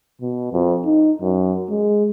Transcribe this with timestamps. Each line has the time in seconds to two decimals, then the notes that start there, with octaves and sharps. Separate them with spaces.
0.21 B2
0.53 F2
0.85 D#4
1.22 F#2
1.70 G#3